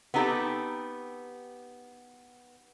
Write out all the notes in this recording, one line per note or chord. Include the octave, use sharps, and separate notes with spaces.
B3 C4 D#4 G4 A4